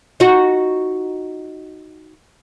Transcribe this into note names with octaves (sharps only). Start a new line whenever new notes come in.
D#4 F#4